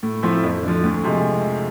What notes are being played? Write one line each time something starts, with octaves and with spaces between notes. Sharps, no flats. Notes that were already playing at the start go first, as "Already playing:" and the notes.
A2
F3 A3 C4 E4
F2
D3 F3
D2
C3 F3 G#3